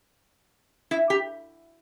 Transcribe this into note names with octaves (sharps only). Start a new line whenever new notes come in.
E4
G4